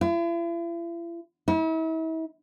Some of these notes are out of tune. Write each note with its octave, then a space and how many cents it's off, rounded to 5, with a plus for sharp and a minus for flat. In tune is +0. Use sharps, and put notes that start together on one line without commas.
E4 +45
E4 -40